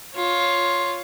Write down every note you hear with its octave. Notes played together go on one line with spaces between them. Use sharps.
F4 C#5